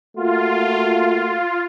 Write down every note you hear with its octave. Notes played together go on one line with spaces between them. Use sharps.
A3 A#3 F4 F#4